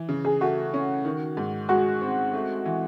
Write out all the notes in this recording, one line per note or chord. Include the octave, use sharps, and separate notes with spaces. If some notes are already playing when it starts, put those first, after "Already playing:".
Already playing: E3
C#3
G#4
A3 F#4
C#4
D#3
G#2
G#3 F#4
C4
A3
E3